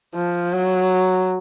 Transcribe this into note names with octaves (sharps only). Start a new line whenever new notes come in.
F3
F#3